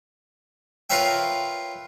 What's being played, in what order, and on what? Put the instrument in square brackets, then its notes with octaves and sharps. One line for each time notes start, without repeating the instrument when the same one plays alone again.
[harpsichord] F4 A#4 B4 C#5 E5 G5